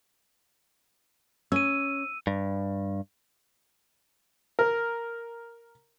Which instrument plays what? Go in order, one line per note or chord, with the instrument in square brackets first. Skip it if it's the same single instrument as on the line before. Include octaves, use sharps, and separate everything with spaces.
[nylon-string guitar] C#4 [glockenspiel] E6 D#7
[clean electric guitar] G2
[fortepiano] A#4